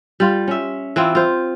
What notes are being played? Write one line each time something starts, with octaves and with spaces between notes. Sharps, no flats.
G3 F4
C#4 E5
E3 C4 E4 F4
F4 C5